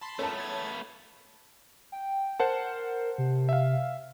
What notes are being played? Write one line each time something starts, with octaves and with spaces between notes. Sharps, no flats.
A5 B5 C6
A3 B3 C#4 A4 A#4 A5
G#6 A6
G5
A#4 C5 F#5 A5
C3
E5 F5